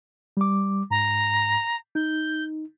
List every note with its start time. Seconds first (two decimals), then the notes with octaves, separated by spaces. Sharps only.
0.37 G3 D6
0.91 G#2 A#5
1.95 D#4 G6